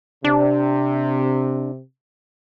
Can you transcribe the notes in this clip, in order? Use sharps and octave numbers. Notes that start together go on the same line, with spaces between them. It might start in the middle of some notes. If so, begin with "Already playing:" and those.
C3 D4